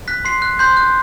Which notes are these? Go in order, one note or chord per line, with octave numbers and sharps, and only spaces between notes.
F#6 B6
C6 C7
F#6
C6 G6
F#6